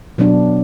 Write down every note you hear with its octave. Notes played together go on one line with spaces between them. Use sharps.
B2 F#3 B3 D4